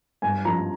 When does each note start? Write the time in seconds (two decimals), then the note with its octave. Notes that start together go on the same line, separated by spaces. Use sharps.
0.22 G2 G#5
0.45 F3 A#5